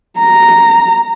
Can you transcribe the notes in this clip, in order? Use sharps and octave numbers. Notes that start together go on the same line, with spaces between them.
A#5